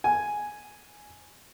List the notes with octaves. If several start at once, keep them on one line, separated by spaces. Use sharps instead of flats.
G#5